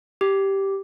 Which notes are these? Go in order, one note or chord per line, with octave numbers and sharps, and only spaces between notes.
G4